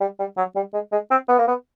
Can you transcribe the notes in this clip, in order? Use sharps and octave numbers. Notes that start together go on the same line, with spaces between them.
G3
G3
F#3
G3
G#3
G#3
C4
B3
A#3
B3